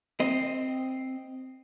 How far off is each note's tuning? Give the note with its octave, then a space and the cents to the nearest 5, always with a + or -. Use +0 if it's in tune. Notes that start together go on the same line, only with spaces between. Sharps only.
C4 +0 D#5 +0